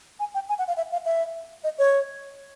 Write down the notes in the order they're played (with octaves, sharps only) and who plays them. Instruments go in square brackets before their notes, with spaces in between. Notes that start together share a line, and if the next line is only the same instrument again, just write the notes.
[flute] G#5
G5
G#5
F#5
F5
E5
F5
E5
D#5
C#5